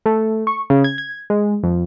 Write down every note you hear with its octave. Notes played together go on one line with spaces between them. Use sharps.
A3
C#6
C#3
G#6
G#6
G#3
F2